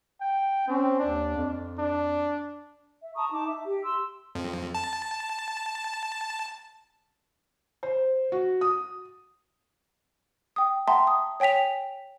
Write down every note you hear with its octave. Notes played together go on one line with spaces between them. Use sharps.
G5
C4 C#4
D#2 D4
F2
D4
E5
A5 A#5 C#6 D#6
D#4 A5 D6
E5
G4
C6 E6
F2
A5
C5
F#4
D#6
G5 D#6
E5 F#5 G5 A5 A#5 C6
D#6
C#5 G5 G#5 B6 F7